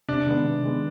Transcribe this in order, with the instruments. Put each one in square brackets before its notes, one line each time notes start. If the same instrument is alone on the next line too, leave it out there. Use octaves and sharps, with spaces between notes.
[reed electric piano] C3 [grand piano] D4
[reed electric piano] D#3 G#3 B3
C3
D#3 G#3 B3